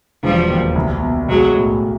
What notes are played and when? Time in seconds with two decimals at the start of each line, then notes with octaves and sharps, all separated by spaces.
0.23 E1 F3 G3
0.50 D#2
0.75 C2
1.02 B2
1.28 B1 F#3 G#3
1.55 A2